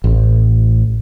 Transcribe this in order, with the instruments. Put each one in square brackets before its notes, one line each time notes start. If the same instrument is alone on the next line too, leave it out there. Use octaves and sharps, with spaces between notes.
[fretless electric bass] A1